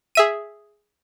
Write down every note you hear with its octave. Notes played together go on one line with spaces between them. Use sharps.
G#4 E5 D#7